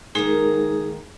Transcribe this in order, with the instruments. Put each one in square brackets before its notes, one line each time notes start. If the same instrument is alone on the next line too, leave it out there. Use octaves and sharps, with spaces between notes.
[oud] D#3 A#3 C5 [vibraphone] G#3 D#4 G#4